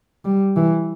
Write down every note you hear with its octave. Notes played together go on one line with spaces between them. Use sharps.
G3
E3